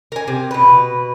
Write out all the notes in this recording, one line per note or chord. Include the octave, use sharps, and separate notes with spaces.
A#4 G#5
C3
B2 B4